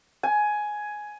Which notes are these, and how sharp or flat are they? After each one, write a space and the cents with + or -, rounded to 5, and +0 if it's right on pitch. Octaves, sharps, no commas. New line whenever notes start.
G#5 +10